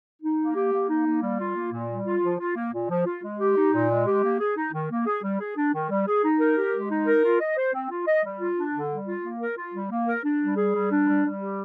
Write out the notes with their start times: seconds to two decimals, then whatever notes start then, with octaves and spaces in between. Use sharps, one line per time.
0.22 D#4
0.39 A#3
0.55 G4
0.73 A#3
0.89 D#4
1.06 A#3
1.22 G3
1.39 F4
1.56 A#3
1.72 A#2
1.89 G3
2.06 F4
2.23 F3
2.40 F4
2.56 A#3
2.73 A#2
2.90 F3
3.06 F4
3.23 G#3
3.39 G4
3.56 D#4
3.74 A#2
3.90 G#3
4.06 G4
4.23 A#3
4.40 G#4
4.56 D#4
4.73 D#3
4.90 A#3
5.06 G#4
5.23 G3
5.40 G#4
5.56 D4
5.73 D#3
5.90 G3
6.07 G#4
6.23 D#4
6.40 A#4
6.57 G4
6.73 G#3
6.90 D#4
7.07 A#4
7.23 F4
7.41 D#5
7.57 C5
7.74 C4
7.90 F4
8.07 D#5
8.24 G3
8.40 F4
8.57 D4
8.74 D3
8.91 G3
9.07 F4
9.24 A#3
9.40 A#4
9.57 F4
9.74 G3
9.91 A#3
10.07 A#4
10.24 D4
10.41 G3
10.57 G#4
10.74 G3
10.91 D4
11.07 G3
11.24 G3
11.41 G4